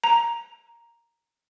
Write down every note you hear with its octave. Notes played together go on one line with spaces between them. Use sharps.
A#5